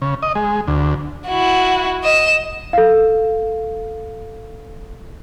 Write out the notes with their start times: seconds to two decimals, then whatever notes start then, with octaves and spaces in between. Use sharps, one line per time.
0.02 C#3
0.22 D#5
0.35 G#3
0.68 D2
1.28 E4 F#4
2.04 D#5 E7
2.73 A4 F5